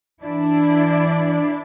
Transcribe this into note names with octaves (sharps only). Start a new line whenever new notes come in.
E3 D4 E4 D5